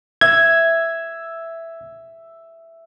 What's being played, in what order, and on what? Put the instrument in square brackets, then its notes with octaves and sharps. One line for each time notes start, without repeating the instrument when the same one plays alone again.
[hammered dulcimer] E5 [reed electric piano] G#6